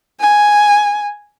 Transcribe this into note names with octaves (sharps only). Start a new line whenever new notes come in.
G#5